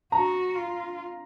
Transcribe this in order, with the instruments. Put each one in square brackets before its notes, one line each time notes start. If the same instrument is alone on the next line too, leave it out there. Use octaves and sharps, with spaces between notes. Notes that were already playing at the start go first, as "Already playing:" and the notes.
[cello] F#4 [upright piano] A#5
[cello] F4